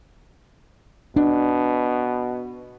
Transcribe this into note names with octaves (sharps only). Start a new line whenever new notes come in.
B2 D4